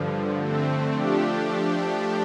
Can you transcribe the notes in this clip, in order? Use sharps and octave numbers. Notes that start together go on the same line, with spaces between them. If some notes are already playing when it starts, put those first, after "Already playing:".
Already playing: G2 D3 F3
D3 A3 C4
F3 A3 D4 G4